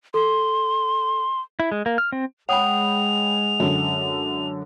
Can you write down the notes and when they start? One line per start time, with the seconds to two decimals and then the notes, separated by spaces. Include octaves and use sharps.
0.14 A4 C6
1.60 E4
1.72 G#3
1.86 A#3
1.98 F6
2.12 C4
2.49 G#3 C#5 F#5 G5 B5 D#6 F7
3.60 F#2 D3 C#4